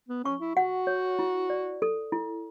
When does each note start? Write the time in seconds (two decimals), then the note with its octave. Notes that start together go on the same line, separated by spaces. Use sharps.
0.09 B3
0.24 C#4 C#6
0.41 E4
0.56 F#4 F#5
0.87 C#5
1.19 E4
1.50 D5
1.82 A4
2.12 E4